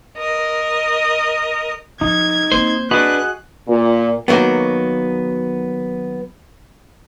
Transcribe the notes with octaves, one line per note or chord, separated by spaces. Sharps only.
A#4 D#5
F3 D#4 G#6
A#3 C4 C5
D4 F#4 G#4 B4 D#5 F#6
A#2
D#3 F#3 A#3 B3